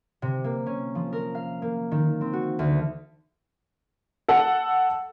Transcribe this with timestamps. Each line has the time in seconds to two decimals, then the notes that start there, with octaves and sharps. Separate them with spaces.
0.22 C3
0.44 A#3
0.66 C#4
0.95 F3
1.13 A#4
1.35 F5
1.62 A#3
1.91 D#3
2.21 C4
2.33 F#4
2.59 D2
4.28 A4 F#5